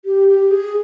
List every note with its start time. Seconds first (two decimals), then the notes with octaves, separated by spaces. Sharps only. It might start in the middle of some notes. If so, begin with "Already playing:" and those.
0.05 G4
0.28 G4
0.51 G#4